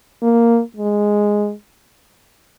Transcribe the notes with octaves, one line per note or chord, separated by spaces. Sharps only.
A#3
G#3